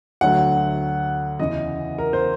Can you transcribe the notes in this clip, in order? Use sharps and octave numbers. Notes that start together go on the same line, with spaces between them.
D2 D3 F#3 A3 F#5
E2 C#3 E3 D#5
A#4
C5